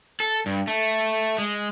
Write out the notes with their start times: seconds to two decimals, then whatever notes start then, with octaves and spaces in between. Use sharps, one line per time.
0.20 A4
0.46 G2
0.67 A3
1.38 G#3